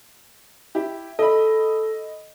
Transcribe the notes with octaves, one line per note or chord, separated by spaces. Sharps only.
E4 G4
A4 D#5 B5